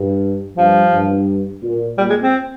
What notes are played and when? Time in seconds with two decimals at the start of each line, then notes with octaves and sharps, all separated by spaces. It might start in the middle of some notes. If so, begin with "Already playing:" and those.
Already playing: G2
0.57 G2 F3
0.92 G2
1.62 A#2
1.98 A#2 G3
2.10 G#3
2.22 C4